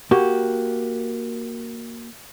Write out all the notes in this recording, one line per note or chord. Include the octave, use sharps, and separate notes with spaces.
A#3 F#4 G4